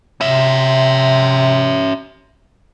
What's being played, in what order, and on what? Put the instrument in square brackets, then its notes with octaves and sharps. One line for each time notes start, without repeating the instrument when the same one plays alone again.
[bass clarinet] C3 [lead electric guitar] C#4 E5